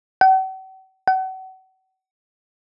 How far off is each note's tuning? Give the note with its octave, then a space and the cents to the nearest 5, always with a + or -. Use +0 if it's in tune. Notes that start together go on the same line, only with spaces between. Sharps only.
F#5 +45
F#5 +35